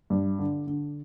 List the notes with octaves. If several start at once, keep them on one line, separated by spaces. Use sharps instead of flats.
G2
D3
D3